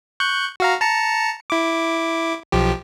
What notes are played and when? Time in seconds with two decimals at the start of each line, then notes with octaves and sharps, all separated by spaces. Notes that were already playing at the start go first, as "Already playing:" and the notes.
0.20 C#6 F#6 G6
0.60 F#4 F5 A#5
0.81 A5 A#5 C#7
1.50 E4 D6
2.52 B1 F3 G4